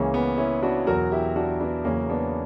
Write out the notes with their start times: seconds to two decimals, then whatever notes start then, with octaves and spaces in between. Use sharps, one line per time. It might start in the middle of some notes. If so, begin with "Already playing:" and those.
Already playing: C#2 C#3 E3 A#3 C#4
0.14 B3
0.38 C#4 E4
0.63 D4 F#4
0.87 E2 B2 F#3 F#4 A#4
1.12 E4 G4
1.36 D4 F#4
1.60 B3 D4
1.85 E2 C#3 F#3 A#3 C#4
2.09 B3 D4